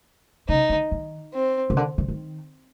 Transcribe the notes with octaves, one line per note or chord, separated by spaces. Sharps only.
C#3 D#4
D3
D#3
C4
C#3
D3
D3
D#3